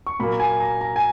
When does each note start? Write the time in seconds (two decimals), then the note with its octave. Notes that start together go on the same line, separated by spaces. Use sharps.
0.07 C#6
0.20 A#2 F#3 A#3 B5
0.40 G#5
0.60 A#5
0.81 A#5
0.96 G#5